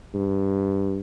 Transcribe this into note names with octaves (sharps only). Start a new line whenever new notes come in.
G2